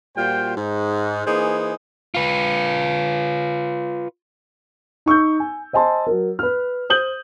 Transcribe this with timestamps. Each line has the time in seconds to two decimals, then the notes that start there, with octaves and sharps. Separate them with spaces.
0.16 A#2 G3 F4 F#4 C5 G5
0.57 G#2 D#4
1.26 E3 A#3 D#4 G#4 C5
2.15 F4 B4
5.06 D#4 C#6 E6 G6
5.40 G#5
5.73 C5 D#5 G#5 A5 C6
6.07 F#3 A#4
6.39 B4 F6
6.90 C5 D#6 G6 F#7